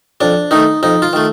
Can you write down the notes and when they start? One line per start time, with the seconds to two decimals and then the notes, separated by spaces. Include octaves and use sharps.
0.21 F2 D4
0.51 D#3 A3 D#4
0.83 F2 D#4
1.02 F4
1.13 D#3 A3